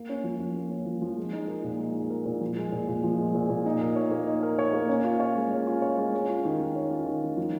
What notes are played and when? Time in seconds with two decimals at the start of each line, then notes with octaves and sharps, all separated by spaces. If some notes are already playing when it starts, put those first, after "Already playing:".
Already playing: A#3
0.09 C#4
0.24 F3
0.39 F3
0.55 A#3
0.71 C#4
0.86 F3
1.02 F3
1.17 G#3
1.33 D#4
1.48 A#4
1.64 A#2
1.79 G#3
1.95 D#4
2.10 A#4
2.26 A#2
2.41 F3
2.57 G#3
2.72 A#2
2.88 A#2
3.04 F3
3.18 G#3
3.35 A#2
3.50 A#2
3.66 D#4
3.81 A#4
3.96 C#5
4.11 A#3
4.27 D#4
4.43 A#4
4.59 C#5
4.73 A#3
4.89 C#4
5.04 F4
5.20 C#5
5.36 G#3
5.51 C#4
5.67 F4
5.82 C#5
5.97 G#3
6.14 C#4
6.30 F4
6.45 D#3
6.60 D#3
6.75 C#4
6.91 F4
7.06 D#3
7.23 D#3
7.37 F3